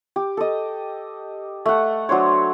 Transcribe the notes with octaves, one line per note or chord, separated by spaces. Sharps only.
G4
A4 D#5
A3 F#5
F#3 D4 C5 C#5